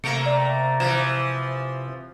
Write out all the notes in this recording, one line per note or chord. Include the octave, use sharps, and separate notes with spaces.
C3 A3 A#3 C#7 D7 F7
D5
E3 F3 C5 G#6 E7